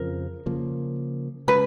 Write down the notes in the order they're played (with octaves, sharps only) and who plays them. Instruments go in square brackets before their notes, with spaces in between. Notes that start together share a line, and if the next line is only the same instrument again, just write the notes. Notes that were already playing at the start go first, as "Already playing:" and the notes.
Already playing: [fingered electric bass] F2 C#3 F3 [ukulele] A#4
[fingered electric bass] C#3 F3 A#3
[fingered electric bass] C#3 G#3 C#4 [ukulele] B4